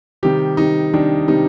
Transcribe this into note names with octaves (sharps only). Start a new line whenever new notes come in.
C3 D#3 G3 G4
C3 D#3 G3 D#4
C3 D#3 G3 D4
C3 D#3 G3 D#4